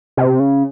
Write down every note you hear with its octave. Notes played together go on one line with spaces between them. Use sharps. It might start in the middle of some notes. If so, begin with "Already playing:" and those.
C3
C#3